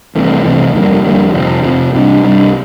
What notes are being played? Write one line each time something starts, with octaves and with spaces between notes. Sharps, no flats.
C2 C3 E3 A3
C2 C3 E3 A3
F2 D3 G3 A#3
F2 D3 G3 A#3
F2 C3 F3
F2 C3 F3
C2 C3 G3 D4
C2 C3 G3 D4